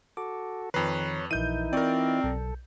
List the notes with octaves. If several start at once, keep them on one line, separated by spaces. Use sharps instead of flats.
F#4 A4 D6
F2 D#3 B4 C#5 A#5 C7
A#1 E3 D#4 E4 A#4 G6 D#7
C4 F4 A#4 D5 C#6
B1 A4